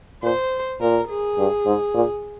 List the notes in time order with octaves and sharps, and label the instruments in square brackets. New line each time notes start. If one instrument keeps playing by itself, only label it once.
[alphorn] A#2 [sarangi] C5
[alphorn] A#2 [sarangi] A#4
[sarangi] G#4
[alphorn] G2
G#2
A#2